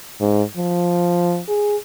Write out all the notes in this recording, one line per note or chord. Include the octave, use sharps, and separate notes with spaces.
G#2
F3
G#4